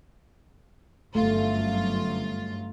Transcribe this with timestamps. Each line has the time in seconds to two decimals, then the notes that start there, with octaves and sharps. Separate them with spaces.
1.15 G1 F#2 A3 F4